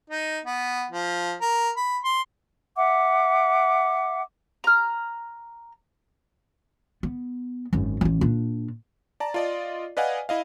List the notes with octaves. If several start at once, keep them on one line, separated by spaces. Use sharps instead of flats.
D#4
B3
F3
A#4
B5
C6
E5 F#5 D6
A#5 F6
B3
G#1 F#2
A1 E3
A#2 D4
D5 A5 A#5
F4 D5 D#5
B4 D5 D#5 F5 F#5 G#5
E4 D#5 F5